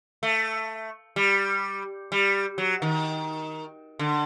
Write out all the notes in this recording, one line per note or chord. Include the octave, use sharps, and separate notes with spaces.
A3
G3
G3
F#3
D#3
D3